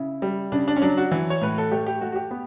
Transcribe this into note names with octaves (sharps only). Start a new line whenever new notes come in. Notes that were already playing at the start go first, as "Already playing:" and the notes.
Already playing: C#3 E4
G3
C#3 D4
D4
C#4
F#3 D4
F#4
E3
C#5
A2 B4
A4
A3 G4
G4
A3 F#4
F#4
G4
B3